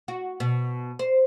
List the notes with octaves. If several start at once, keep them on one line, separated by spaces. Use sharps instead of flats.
F#4
B2
C5